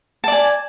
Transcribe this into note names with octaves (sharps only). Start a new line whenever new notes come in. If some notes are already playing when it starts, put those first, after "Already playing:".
D5 G#5 A5